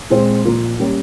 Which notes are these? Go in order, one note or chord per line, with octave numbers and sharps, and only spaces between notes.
A#2 G#3 C4 F4 C5
A#2 F3 A#3 F4
G3 A#3 C#4